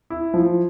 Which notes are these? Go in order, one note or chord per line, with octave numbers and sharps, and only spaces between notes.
E4
F3